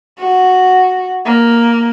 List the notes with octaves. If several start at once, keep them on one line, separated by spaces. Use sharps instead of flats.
F#4
A#3